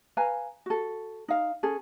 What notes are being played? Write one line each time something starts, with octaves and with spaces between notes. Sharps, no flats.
B4 F5 G#5 A#5
F#4 A4
D#4 F5
C#4 G#4 A4